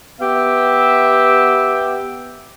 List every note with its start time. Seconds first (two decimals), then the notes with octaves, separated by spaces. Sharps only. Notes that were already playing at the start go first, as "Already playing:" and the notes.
0.20 B3 G4 E5